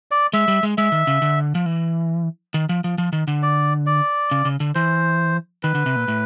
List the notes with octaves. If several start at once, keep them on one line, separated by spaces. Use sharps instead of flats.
D5
G#3 E5
G3
G#3
G#3 E5
D#3
C#3
D3
F3
E3
D#3
F3
F3
F3
D#3
D3
D5
D5
C#3
C#3
D3
E3 C5
D#3 B4
D3
C3
A#2
A2